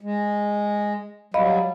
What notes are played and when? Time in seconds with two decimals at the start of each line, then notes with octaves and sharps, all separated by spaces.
0.01 G#3
1.34 F#3 G3 D#5 F5 B5